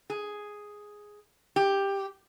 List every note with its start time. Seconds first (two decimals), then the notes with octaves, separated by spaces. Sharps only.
0.10 G#4
1.56 G4